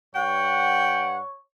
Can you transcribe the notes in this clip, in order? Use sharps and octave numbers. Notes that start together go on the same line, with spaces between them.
G2 C#5 F#5 G5